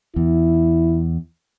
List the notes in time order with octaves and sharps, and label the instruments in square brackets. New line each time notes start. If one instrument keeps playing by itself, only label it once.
[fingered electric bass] E2 [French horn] E4